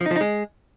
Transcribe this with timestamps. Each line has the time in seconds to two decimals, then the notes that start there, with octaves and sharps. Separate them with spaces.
0.01 F3
0.06 D#4
0.11 F3
0.16 D#4
0.21 G#3